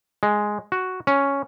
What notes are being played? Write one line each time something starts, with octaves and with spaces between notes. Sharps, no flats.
G#3
F#4
C#4